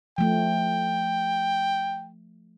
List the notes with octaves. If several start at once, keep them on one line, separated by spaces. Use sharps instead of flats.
F3 A3 G5